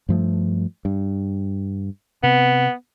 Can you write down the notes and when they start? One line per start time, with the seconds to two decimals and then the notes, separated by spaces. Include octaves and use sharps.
0.09 G2 F3 A3
0.85 G2
2.23 C3 B3